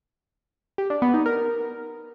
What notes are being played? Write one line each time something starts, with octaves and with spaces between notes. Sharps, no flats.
G4
D4
B3
D#4
A#4